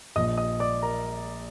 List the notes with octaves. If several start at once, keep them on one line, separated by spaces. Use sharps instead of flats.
A#1 A#2 F3 D#5 D#6
D#5 D#6
D5 D6
A#4 A#5